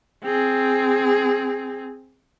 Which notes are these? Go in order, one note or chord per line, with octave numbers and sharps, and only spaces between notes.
C4 G#4